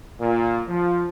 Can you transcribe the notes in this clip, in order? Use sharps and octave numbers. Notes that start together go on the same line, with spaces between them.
A#2
F3